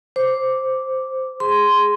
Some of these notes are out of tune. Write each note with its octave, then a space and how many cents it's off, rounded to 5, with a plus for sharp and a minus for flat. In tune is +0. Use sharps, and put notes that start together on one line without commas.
C5 +0 D6 -5
G#4 -10 C6 -10